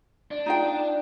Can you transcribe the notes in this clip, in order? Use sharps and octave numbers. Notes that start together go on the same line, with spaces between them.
D4
D#4 F4 G5